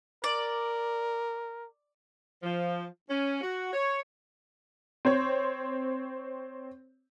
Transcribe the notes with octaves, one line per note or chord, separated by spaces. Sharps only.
A#4 D5
F3
C#4
F#4
C#5
C4 C5 C#5